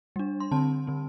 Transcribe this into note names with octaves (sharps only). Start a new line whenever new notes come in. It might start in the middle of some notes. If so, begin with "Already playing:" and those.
G3 D4
C6
D3 C4 A5
D3 C4